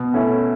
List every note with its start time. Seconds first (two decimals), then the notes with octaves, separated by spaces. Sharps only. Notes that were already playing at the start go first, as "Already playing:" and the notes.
Already playing: B2
0.14 A3 C#4 E4